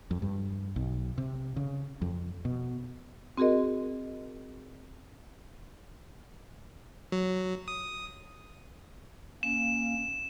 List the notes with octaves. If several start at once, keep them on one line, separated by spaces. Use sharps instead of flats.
F2
G2
B1
C3
C#3
F2
B2
C4 F#4 G#4 A#4 D#5
F#3
D#6
A#3 C#4 E7